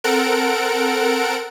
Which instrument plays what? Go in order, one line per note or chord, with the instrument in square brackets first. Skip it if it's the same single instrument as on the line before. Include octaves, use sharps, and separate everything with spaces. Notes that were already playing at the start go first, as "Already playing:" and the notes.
[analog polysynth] C4 A4 A#4 F#5 D7